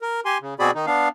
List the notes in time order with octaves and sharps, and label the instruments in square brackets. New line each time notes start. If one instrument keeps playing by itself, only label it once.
[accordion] A#4
G4 G#5 C6
C#3
B2 C4 F#4 G#4 D5 B5
D#3 D#4
B3 D4 F5